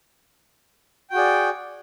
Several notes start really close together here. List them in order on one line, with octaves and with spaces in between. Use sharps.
G5 F#4 G#4 D5